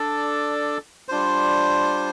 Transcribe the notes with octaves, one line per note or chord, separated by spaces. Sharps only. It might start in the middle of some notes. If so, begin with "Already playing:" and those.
Already playing: D4 A4 D5
G3 D4 F4 C5